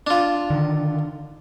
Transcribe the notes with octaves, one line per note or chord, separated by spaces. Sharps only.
D4 F4
D3 D#3